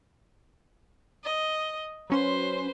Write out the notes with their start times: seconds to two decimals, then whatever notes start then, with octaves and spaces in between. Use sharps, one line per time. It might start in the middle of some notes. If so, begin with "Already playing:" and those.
1.25 D#5
2.10 F#3 C#4 B4 C5 C6